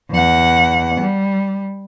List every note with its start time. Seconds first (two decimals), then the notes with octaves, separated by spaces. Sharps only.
0.11 E2 F#5
1.01 G3